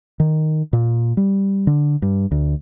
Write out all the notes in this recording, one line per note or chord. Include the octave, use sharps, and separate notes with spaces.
D#3
A#2
G3
D3
G2
D2